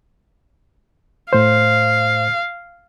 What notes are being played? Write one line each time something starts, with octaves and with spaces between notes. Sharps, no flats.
A2 C5 F5